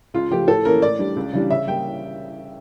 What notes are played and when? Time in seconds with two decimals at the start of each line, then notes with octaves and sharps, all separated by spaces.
0.14 C#2 F4
0.30 C#3 F3 A3 G4
0.48 A2 A4
0.65 E3 A#3 C#4 A#4
0.82 A2 D5
0.99 G3 D4
1.16 C#2
1.33 C#3 E3 G3 D4
1.50 C#3 E5
1.67 G3 A#3 G5